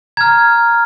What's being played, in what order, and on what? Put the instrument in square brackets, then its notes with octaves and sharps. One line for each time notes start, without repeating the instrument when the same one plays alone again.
[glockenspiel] A#5 F6 G#6